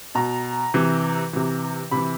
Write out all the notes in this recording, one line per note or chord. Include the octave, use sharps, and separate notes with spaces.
B2 A#5
C3 E3
C3 E3
C3 E3 B5